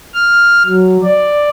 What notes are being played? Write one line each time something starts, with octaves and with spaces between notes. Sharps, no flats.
F6
F#3
D5